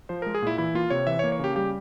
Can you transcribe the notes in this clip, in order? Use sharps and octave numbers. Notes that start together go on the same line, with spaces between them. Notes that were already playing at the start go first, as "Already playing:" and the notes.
F3 C5
G#3 A#4
G#4
A#2 E4
E3 E4
A#3 F4
C3 C#5
E3 E5
C#5
A#3
C#5
C#3 G4
G3 G4